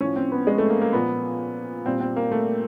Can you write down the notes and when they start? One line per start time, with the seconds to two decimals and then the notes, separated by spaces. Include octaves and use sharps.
0.01 A2 F3 C#4
0.16 C4
0.32 B3
0.47 G#3
0.58 A3
0.70 A#3
0.81 A#3
0.93 A#2 F3 B3
1.86 A#2 G3 C4
2.01 C4
2.16 A#3
2.31 A3